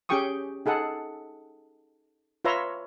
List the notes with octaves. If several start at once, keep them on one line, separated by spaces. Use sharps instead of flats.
C#4 G4 G#4 G5 C#6 D#6
D#4 G#4 A4 F#5
F4 B4 C#5 E5 A#5 C6